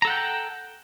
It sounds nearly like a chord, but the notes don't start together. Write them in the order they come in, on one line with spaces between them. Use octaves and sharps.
A#5 A4 F#5 G5